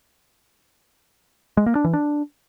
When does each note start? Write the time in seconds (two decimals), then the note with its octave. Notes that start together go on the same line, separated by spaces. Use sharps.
1.57 G#3
1.66 A#3
1.75 D4
1.84 E3
1.93 D4